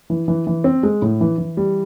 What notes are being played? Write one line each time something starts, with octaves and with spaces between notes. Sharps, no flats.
E3
E3
E3
C4
G#3
A2
E3
E3
G3